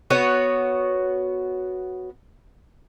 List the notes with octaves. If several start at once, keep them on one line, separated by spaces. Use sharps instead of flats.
B3 F#4 C#5